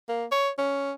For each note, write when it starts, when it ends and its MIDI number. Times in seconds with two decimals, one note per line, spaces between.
0.09 0.25 58
0.31 0.49 73
0.58 0.92 61